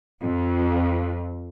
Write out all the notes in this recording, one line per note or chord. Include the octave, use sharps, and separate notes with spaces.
F2